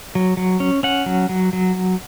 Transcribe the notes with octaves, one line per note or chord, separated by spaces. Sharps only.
F#3
F#3
C#4
C#4 F#5
F#3
F#3
F#3